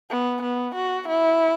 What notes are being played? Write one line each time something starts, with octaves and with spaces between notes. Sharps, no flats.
B3
B3
F#4
E4